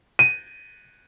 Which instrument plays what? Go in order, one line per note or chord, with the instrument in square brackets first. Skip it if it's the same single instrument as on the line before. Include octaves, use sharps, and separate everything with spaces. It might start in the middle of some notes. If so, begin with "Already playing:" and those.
[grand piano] D#7